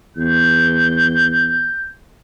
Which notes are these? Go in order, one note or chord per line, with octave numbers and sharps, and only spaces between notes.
E2 G6